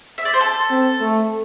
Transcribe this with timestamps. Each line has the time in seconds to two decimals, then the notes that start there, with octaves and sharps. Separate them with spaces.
0.18 E5
0.25 D5
0.33 C5
0.40 A4
0.70 C4
1.00 A3